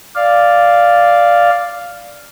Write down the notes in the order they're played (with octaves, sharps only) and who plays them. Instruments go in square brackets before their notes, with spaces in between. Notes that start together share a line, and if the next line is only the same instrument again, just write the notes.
[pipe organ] D5 F5